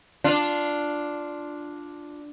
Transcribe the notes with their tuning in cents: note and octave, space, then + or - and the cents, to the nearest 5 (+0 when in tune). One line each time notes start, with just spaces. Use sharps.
D4 +0 F4 +0